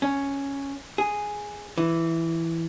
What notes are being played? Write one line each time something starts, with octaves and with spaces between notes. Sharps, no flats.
C#4
G#4
E3